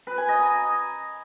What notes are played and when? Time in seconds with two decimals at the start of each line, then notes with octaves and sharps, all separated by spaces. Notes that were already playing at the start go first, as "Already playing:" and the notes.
0.07 B4
0.18 G#5
0.28 D#5
0.39 A#5